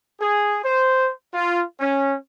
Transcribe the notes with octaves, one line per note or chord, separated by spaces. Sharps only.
G#4
C5
F4
C#4